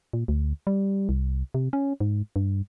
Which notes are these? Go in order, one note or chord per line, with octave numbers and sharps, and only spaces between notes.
A#2
D2
G3
C2
C3
C#4
G#2
G2